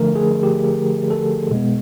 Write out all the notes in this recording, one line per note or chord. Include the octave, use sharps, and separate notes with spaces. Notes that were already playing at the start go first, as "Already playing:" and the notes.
Already playing: D3 F3 A3 A#4
G#4
G4
A4
B2 G#3 B3